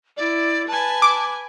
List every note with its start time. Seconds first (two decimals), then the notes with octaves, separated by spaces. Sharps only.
0.17 E4 D5
0.68 B4 G#5 A5
1.02 D6